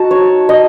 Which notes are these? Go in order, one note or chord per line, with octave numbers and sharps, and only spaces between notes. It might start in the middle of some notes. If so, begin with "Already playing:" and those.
Already playing: D#4 F#4 A5
C#5
D#5